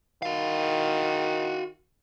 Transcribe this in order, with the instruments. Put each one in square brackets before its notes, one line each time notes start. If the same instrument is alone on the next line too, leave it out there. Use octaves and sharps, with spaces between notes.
[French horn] D#3 [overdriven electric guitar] F#4 F5